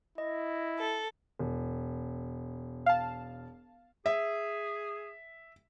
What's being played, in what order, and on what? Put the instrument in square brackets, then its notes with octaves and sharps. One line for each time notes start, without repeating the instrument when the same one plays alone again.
[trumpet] E4 [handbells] D#5
[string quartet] A4
[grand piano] E1
[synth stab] F5 A5
[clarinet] G#4 [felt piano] E5